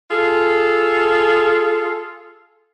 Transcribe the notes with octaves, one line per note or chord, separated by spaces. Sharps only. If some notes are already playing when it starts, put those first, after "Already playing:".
F4 G#4 A4